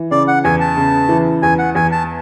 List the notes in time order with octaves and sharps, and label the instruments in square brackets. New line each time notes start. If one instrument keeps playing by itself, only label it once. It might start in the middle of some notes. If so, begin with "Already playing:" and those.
Already playing: [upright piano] E3
[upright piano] C#3 [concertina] D5
[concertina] F#5
[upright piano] E2 [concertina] G#5
[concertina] A5
[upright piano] C#3
E3
[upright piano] E2 [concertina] G#5
[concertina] F#5
[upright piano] E2 [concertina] G#5
[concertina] A5